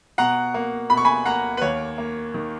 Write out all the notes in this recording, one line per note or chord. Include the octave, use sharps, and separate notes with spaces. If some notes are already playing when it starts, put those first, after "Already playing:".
B2 F#5 A#5
A#3
B2 B5
C#6
G#5 B5
A#3 F#5 A#5
B4
D#2 C#5
A#3
D#3